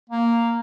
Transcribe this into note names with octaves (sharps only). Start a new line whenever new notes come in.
A#3